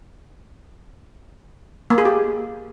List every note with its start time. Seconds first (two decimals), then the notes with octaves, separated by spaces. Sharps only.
1.90 A#3
1.98 G#4
2.05 G4